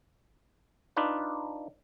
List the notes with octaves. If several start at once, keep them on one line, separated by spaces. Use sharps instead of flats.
D4 D#4 F4 B4